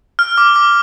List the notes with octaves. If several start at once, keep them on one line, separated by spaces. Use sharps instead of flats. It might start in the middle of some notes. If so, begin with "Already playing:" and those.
F6
D6
D6